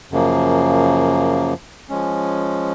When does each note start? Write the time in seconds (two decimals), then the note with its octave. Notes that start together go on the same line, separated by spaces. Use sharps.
0.11 F#2 C#3 F3 A#3
1.90 F3 G#3 C#4